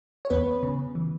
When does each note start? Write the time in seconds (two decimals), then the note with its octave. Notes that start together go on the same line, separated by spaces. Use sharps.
0.25 C#5
0.30 E2 B3 B4
0.63 C#3
0.95 E3